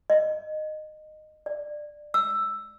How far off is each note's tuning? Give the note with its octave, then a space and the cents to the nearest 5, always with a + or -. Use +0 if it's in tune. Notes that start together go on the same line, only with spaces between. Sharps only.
D#5 -15
D5 +15
E6 +5